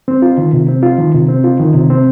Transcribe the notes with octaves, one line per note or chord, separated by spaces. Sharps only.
C4
F4
D#3
C3
C4
F4
D#3
C3
C4
F4
D#3
C3
C4